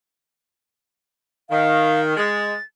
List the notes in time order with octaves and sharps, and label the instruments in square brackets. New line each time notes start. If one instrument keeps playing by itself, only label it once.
[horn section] D#3 [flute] F5
[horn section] G#3 [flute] A6